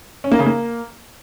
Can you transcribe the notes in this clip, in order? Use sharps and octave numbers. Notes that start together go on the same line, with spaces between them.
C#4
A#3
C#3
A#3